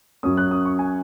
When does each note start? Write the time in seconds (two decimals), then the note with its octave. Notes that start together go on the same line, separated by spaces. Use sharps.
0.23 F#2 F#3 C#4 D#6
0.37 F#6
0.51 D#6
0.65 C#6
0.79 G#5